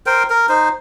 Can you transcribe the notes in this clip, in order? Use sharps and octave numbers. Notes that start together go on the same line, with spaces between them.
A#4 C5 G5
A#4
D#4 C5